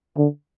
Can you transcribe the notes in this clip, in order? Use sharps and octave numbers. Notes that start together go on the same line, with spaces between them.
D3